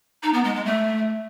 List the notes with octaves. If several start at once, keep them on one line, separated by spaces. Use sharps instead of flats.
D#4
B3
G#3
G#3
A3